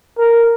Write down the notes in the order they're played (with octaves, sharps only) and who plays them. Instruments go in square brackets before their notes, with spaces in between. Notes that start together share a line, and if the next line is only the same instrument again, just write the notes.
[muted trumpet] A#4